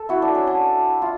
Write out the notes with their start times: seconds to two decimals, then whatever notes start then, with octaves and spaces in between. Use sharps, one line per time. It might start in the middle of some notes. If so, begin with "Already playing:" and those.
Already playing: A4
0.09 E4 F#4
0.22 D4
0.35 C#4
0.47 D4
1.02 F4